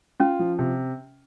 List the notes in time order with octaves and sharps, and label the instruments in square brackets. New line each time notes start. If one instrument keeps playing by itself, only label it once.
[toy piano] C#4 [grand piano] F4
[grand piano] F3
C3